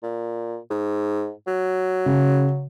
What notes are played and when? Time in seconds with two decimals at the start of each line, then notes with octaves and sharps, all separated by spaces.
0.03 A#2
0.71 G#2
1.47 F#3
2.06 C#3